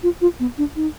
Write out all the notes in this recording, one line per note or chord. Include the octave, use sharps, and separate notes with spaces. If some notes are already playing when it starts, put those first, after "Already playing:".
F4
F4
B3
D4
D#4